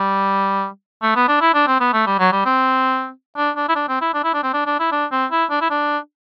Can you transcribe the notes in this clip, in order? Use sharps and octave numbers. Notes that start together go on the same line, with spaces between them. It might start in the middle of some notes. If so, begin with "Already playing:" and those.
Already playing: G3
A3
B3
D4
E4
D4
C4
B3
A3
G3
F#3
G3
C4
D4
D4
E4
D4
C4
E4
D4
E4
D4
C4
D4
D4
E4
D4
C4
E4
D4
E4
D4